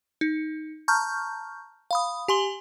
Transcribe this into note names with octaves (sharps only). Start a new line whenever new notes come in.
D#4
A5 A#5 C#6 F6 G6
F5 B5 D#6
G4 G#5 C6 F#7 G7